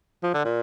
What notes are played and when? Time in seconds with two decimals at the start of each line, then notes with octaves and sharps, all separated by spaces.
0.23 F3
0.34 D3
0.45 A#2